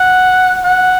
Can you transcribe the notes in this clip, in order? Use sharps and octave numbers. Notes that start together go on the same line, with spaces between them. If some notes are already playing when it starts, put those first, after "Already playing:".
Already playing: F#5
F#5